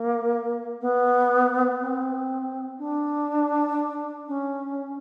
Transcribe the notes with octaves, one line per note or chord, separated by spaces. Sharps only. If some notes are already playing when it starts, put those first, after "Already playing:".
Already playing: A#3
B3
C4
D4
C#4